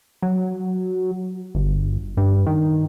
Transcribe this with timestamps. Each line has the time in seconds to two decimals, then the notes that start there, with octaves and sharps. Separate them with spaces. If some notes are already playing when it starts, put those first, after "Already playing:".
0.22 F#3
1.54 G1
2.17 G2
2.46 D#3